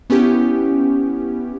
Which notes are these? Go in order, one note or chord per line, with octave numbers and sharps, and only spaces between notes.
B3 C#4 E4 G4